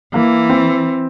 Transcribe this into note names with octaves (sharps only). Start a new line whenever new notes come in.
E3 A#3
C4